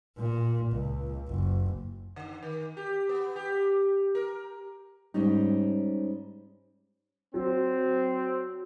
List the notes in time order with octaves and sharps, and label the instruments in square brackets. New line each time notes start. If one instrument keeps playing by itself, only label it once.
[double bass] A#2
C#2
F#1
[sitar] D3
D#3
G4
B3
G4
A#4
[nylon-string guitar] G#2 G3 C#4 D#4
[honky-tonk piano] F#3 [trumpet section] C4